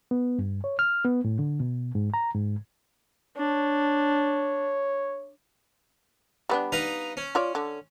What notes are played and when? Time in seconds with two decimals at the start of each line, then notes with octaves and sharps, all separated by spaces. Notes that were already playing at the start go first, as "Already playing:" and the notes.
0.11 B3
0.39 G2
0.64 C#5
0.79 F6
1.04 B3
1.25 A2
1.39 D3
1.60 B2
1.95 G#2
2.14 A#5
2.34 G#2
3.37 D4 C#5
6.49 G3 B3 D4
6.72 D#4 B4 F5
7.17 C#4
7.35 F4 C#5 D5
7.55 D3